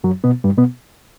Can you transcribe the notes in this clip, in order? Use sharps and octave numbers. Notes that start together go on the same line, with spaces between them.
F#2 F#3
B2 B3
G2 G3
B2 B3